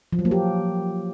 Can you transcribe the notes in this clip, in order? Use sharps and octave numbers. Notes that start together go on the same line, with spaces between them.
F3
F#3
A#3
G4